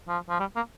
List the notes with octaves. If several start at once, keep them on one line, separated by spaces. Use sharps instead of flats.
F3
F3
G3
A#3